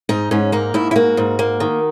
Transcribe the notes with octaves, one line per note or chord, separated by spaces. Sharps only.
G#2 D#4
G#2 C#4
A#3 D#4
G#2 E4
E4
A#3 F#4
G#2
A#3
D#3